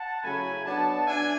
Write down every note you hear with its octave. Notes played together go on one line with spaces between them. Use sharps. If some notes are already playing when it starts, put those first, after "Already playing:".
Already playing: F#5 A5
C#3 F#3 A3 E4 G#5 B5
F#3 B3 D4 F#5 A5
D4 E5 G#5